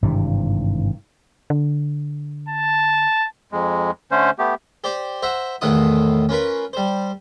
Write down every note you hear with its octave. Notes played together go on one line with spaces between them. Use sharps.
G#1 G2 C3 E3
D3
A5
F2 G#3
D3 A3 C#4 C5
A3 B3 G4
G4 C5 D5
C5 E5 F#5 A#5
E2 A2 D#3 F4 F#5 D#6
C#4 F4 A#4 B4
G3 C5